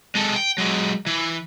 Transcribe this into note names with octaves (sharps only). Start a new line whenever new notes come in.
G#3 A4
G5
F#3 G#3
E3